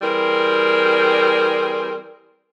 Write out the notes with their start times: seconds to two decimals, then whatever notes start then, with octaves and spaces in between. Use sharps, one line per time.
0.02 E3 G3 C4 G#4 A#4